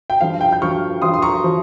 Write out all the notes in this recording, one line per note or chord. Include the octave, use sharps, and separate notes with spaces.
G5
G2 F3 F5
G5
G6
G2 F3 C#6 F6
G2 F3 C6 D#6
C6
A#5 C#6
F3